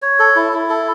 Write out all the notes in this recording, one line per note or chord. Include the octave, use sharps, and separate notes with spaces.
C#5
A4
E4
E4
A4